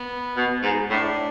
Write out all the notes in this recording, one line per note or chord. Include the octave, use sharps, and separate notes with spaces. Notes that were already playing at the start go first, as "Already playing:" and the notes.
Already playing: B3
B2
G#2
A2 D4